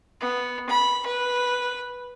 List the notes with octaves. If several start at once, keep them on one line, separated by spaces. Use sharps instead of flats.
B3
B5
B4